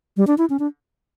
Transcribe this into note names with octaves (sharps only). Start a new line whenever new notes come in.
G3
D4
E4
C#4
D4